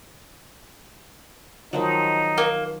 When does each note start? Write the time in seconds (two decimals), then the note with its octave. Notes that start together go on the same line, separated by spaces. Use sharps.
1.73 D#3 F3 F#3 D#4
2.38 A#3